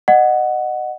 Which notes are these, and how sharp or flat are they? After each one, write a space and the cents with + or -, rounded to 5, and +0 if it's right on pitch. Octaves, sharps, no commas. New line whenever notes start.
D#5 -25 F#5 +0